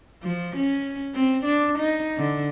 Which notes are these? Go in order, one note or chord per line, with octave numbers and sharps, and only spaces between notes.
F3
C#4
C4
D4
D#4
D3